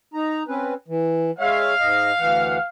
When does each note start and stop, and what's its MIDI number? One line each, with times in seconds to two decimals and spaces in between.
0.14 0.43 63
0.14 0.43 82
0.48 0.74 60
0.48 0.74 61
0.48 0.74 71
0.88 1.31 52
1.40 1.74 56
1.40 1.74 73
1.40 1.74 76
1.40 2.69 77
1.79 2.12 44
1.79 2.12 75
2.19 2.58 38
2.19 2.58 52
2.19 2.58 78